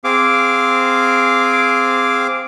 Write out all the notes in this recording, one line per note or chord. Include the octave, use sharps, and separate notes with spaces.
C4 G#4 F5 D6